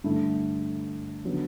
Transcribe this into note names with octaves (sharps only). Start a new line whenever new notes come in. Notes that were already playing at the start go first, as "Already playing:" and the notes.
G2 D3 A3 E4
D3 F#3 B3